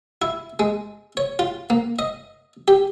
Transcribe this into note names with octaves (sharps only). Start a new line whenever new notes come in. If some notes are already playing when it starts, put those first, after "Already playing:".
E4
G#3
C#5
F4
A#3
D#5
G4